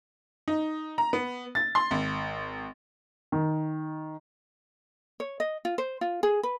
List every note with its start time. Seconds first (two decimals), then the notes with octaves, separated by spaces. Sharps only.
0.48 D#4
0.98 A#5
1.13 B3
1.55 A6
1.75 C6
1.91 G#1
3.32 D#3
5.20 C#5
5.40 D#5
5.65 F4
5.78 C5
6.01 F4
6.23 G#4
6.43 B4